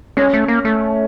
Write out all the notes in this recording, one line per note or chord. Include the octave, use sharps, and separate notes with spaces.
G#3 C#4
A3
A#3
A3